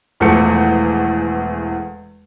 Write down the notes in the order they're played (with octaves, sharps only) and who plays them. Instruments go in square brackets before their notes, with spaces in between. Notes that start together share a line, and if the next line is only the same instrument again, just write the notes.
[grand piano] E1 E2 F3 A3 E4 C#7